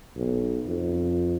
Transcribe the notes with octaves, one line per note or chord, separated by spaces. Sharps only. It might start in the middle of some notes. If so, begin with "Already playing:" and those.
B1
F2